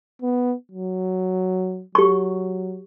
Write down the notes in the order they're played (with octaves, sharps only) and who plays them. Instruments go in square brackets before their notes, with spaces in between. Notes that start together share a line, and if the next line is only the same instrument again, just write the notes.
[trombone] B3
F#3
[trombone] F#3 [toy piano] G4 C#6